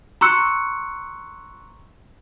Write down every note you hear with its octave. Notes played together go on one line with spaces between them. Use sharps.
A#5 C6 C#6 E6 F#6 C#7